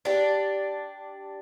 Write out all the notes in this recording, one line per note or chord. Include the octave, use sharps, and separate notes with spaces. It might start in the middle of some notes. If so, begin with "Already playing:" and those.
D4 G4